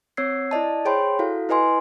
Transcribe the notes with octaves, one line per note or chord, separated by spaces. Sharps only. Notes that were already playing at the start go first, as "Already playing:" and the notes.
C4 C#5 E6 G#6 C7
E4 D5 D#5 A5
G#4 C5 C#5 G5 B5 C6
E4 F#4 A4 F5
E4 B4 D#5 G#5 C6